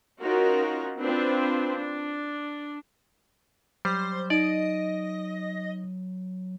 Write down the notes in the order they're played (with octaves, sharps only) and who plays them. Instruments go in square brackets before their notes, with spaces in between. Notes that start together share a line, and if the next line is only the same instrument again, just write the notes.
[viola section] C#4 D#4 F4 F#4 A#4
C4 D4 F4 B4 C5
D4
[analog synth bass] F#3 [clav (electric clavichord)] G3 [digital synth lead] C5
[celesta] D#4 D7 [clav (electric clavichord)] D5 [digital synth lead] D#5